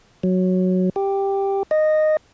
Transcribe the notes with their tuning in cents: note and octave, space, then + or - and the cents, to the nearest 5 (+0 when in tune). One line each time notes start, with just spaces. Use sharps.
F#3 -5
G4 +5
D#5 -10